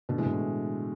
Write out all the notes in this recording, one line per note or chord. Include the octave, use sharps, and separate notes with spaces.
B2 D3
E3 G#3
B2 D3
A2